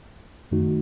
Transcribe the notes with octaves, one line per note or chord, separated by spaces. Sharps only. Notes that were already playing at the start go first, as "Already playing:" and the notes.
F#2 D#3 A3 D#4 F#4